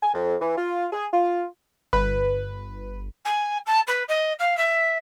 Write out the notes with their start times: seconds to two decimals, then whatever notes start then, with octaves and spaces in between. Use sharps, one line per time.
0.02 G#5
0.14 F2
0.41 E3
0.57 F4
0.93 G#4
1.13 F4
1.93 G1 B4
3.25 G#5
3.66 A5
3.87 B4
4.08 D#5
4.39 F5
4.57 E5